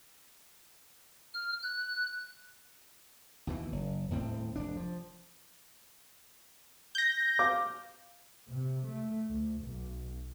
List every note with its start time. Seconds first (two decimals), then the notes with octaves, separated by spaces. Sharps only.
1.34 F6
1.63 F#6
3.47 D#2 B2 E3
3.72 F#1
4.10 D#1 A2 C4
4.56 F1 D4
4.77 F3
6.95 G6 A#6
7.39 F5 D6
8.49 C3
8.86 A3
9.28 D2
9.61 B1